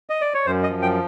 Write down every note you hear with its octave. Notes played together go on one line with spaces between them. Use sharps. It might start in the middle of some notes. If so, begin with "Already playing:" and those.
D#5
D5
C#5
F#2 C5
D#5
F3
G5